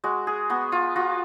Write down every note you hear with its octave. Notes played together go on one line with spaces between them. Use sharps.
G#3 F#4
G#4
B3 F#4
F4
F4 F#4